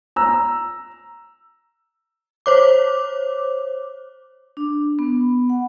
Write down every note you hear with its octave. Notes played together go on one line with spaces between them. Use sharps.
A#5 E6
C5 C#5 D6
D4
B3
F#5